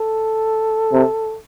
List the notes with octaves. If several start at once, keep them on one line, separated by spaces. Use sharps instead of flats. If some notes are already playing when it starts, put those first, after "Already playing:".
Already playing: A4
C3